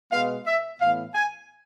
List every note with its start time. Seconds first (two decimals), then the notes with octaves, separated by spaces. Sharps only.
0.12 B2 G#3 B3 F5
0.47 E5
0.81 A2 E3 B3 F5
1.15 G#5